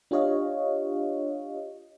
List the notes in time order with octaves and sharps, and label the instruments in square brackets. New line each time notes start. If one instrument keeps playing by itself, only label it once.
[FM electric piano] D4 F4 G4 C#5 D#5 F5